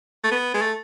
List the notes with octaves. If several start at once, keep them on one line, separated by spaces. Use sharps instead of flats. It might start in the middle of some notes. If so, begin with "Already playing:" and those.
A3
B3
G#3
A3